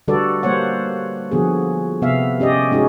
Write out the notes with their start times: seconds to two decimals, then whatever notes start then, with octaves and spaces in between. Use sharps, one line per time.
0.08 D3 G3 F#4 A4 B4 D5
0.43 G3 A#3 C5 C#5 F#5
1.31 D3 F3 B3 F#4 G#4
2.02 C3 B3 E5 F5
2.40 C#4 G4 D5 D#5
2.71 G#3 C#4 D#4 F#4 G#4